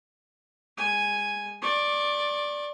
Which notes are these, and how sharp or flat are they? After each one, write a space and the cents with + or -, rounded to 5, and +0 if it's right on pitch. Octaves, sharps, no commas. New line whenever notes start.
G#3 -35 G#5 +0
D5 +0 C#6 -45